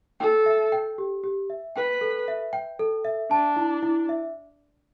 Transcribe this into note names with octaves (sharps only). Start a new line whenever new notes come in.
A4 G5
E5
G5
G4
G4
E5
B4 G5
A4
E5
G5
A4
E5
D4 A5
E4
E4
E5